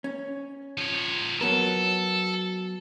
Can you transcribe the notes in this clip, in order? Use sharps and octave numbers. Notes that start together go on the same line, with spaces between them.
C#4
F3 C#5
F#3 B3 A4 A#4